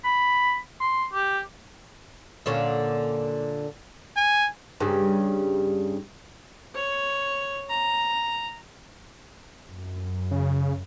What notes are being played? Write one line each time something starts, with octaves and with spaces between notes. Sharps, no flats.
B5
C6
G4
A#2 D3 C#4
G#5
G2 C#3
C#5
A#5
F#2
C#3